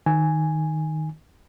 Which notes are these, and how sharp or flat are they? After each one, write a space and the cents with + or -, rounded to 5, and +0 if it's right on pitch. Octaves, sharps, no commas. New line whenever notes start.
D#3 +0 G#5 +0